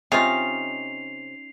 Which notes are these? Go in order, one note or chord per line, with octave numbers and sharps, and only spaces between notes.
C3 C#4 D#4 F4 C7 F7